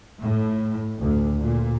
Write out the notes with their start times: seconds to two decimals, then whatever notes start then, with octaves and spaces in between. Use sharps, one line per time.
0.20 A2
0.99 D2
1.41 A#2